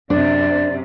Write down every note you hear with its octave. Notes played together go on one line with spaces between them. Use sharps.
F#2 C3 D4 D5